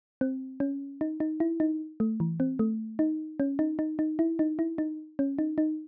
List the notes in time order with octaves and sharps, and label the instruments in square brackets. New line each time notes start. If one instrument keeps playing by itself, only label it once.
[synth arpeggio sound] C4
C#4
D#4
D#4
E4
D#4
A3
E3
C4
A3
D#4
C#4
D#4
D#4
D#4
E4
D#4
E4
D#4
C#4
D#4
D#4